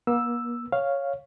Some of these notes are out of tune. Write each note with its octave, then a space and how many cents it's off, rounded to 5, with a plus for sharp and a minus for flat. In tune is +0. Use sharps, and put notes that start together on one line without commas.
A#3 +45 E6 +0
C#5 +0 F5 +0